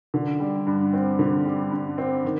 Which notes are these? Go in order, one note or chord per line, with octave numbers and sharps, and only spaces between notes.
D3
G3
G2
C4
D3
G3
G2
C4
D#3